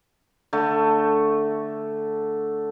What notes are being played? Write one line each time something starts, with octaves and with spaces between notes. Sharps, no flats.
D3 A3